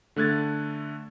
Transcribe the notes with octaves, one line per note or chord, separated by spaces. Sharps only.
D3 A3 F#6 G#6 A6